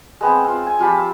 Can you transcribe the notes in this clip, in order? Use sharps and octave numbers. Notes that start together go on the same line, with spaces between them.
G#3 B3 C4
C4 F4
G#5
F3 F4 G4 B5
E6